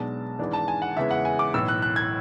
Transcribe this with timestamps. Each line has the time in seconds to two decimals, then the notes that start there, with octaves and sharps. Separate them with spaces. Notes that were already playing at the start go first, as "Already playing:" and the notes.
Already playing: B1 B2 G#3 D4 A5
0.39 G#1 G#2 E3 G#3 D4
0.53 A5
0.68 G#5
0.82 F#5
0.97 E2 C#3 E3 G#3 E5
1.11 F#5
1.25 G#5
1.39 D6
1.54 B1 A2 E3 E6
1.68 F#6
1.82 F#6
1.96 G#6